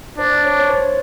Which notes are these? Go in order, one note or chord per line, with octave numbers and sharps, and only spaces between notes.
D4 C5
C#5
C#5
C5